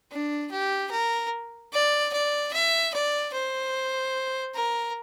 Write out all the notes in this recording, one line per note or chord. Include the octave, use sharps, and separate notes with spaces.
D4
G4
A#4
D5
D5
E5
D5
C5
A#4